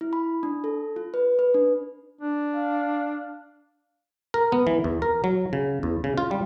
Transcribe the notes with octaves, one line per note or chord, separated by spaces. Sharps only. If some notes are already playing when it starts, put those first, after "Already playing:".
E4
B5
D4
A4
F4
B4
B4
D4
D4
F5
A#4
B3
E3
E2
A#4
F#3
C#3
E2
C#3
F4
G3